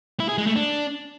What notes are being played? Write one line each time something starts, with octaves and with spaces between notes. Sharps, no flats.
E4
G#4
G#3
A3
D4